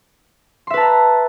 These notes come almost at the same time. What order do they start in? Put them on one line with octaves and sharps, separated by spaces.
C6 E5 B4 A5 A#5